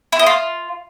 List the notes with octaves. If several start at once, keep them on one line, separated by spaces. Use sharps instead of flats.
E4
D#5
F4